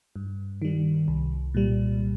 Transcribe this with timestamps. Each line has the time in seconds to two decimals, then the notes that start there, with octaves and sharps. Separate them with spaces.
0.16 G2
0.62 D#3 G3
1.08 C2
1.54 A#2 G3